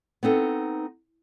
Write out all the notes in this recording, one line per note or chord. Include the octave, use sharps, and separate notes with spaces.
B3 C4 D#4 A4